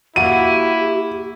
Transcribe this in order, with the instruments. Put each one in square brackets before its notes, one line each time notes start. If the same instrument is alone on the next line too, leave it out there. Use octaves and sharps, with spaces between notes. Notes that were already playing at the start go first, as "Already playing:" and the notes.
[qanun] A#3 F#4 [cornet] E4 [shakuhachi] G4 [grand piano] D#7